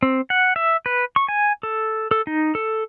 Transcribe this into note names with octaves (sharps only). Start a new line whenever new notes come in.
C4
F#5
E5
B4
C#6
G#5
A4
A4
D#4
A4